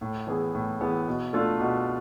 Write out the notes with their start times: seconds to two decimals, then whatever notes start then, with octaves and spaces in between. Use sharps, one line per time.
0.01 A2
0.27 E3 B3 E4 G#4
0.55 A2
0.80 E3 B3 E4 G#4
1.07 B2
1.33 A3 D4 F4 A4
1.60 B2